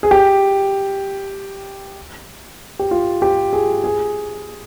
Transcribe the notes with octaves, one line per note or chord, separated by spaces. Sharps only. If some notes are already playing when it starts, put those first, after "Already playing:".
G#4
G4
G4
F4
G4
G#4
G#4